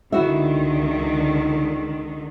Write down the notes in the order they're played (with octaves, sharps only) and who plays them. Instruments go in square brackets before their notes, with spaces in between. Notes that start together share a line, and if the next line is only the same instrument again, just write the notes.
[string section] C#2 D3 D#3 [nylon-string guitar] E4 F#4 E5